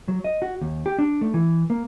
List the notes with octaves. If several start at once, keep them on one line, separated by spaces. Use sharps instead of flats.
F#3
D#5
F#4
D#2
G4
D4
A3
E3
A#3